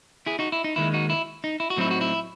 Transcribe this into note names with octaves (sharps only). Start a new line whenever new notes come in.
E4 G#4
D#4 F#4
E4
D#4
D#2 D#3 G#3 E4
D#4 F#4
E4
D#4
E4
F#4
A2 F#3 C4 D#4 E4
F#4
E4